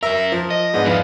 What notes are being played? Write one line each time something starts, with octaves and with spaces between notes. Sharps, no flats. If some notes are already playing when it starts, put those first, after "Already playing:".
F#2 A#4 E5
F3
D#5
G#2 B3 D4
F3 E4 B4 F5